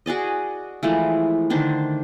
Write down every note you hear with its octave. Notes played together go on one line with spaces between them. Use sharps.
F#4 G#4 D5 D#5
E3 F3 G#3 A3
D3 D#3 D4 C5